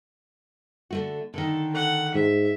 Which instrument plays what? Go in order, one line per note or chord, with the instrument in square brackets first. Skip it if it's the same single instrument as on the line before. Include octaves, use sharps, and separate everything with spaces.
[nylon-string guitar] D3 A3 F#4
[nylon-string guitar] D3 D#3 [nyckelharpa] A4
[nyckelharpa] A4 F#5
[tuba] G#2 [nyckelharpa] E5